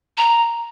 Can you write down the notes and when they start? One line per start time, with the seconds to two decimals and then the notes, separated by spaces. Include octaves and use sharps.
0.17 A#5